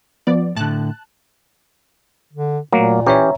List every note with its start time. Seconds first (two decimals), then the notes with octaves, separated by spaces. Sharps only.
0.27 F3 B3 D5
0.56 A2 D3 A5 F#6
2.33 D3
2.73 A#2 F#3 A3 A#3
3.07 E3 C#4 G4 C#5 E5 A#5